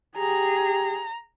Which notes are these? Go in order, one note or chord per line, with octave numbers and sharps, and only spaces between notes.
G4 G#4 A#5